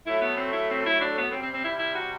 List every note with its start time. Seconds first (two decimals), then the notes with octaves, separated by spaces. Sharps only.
0.06 A2 F#3 A3 E4
0.22 B3
0.38 C4
0.53 E4
0.70 C4
0.85 E4
1.01 D4
1.17 B3
1.32 C3 G3 C4
1.43 C4
1.54 C4
1.64 E4
1.79 E4
1.96 F#4